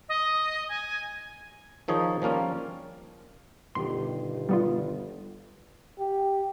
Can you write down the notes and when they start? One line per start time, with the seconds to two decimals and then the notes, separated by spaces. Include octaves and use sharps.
0.09 D#5
0.69 G#5
1.88 D#3 F3 D#4 G#4 C#5
2.22 F3 G3 A#3 C#4 F4
3.75 G1 B2 D#3 G4 C6
4.49 G3 B3 F4
5.99 G4